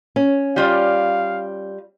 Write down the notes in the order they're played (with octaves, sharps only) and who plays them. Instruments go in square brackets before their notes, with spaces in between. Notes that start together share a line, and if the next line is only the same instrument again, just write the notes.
[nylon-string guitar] C#4
[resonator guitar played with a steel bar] G3 F4 D5 [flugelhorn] F5